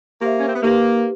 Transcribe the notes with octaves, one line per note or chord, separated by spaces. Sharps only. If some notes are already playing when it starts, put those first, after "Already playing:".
A#3 G4 C5 E5
C#4
C4
B3
A#3 D#4 G4 B4